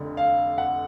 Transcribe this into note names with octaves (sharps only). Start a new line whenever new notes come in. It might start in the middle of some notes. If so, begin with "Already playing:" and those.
Already playing: F1 F2 D3
F5
F#5